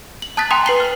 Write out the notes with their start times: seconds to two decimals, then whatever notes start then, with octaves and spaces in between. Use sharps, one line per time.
0.22 F#7
0.37 A5 D#6 F#6 A6 B6
0.51 G5 G#5 A#5 C6 D#6
0.66 B4 C7 G7
0.80 F6